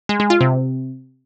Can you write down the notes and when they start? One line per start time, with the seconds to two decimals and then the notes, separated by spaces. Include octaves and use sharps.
0.09 G#3
0.20 G#3
0.30 F4
0.41 C3